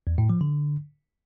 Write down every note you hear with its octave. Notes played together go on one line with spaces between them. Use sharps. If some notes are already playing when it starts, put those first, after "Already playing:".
E2
A2
F3
D3